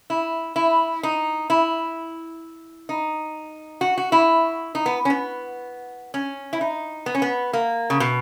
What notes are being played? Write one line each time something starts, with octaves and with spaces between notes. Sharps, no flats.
E4
E4
D#4
E4
D#4
F#4
F#4
E4
D#4
B3
C#4
B3
C#4
E4
D#4
B3
C#4
B3
A#3
C#3
B2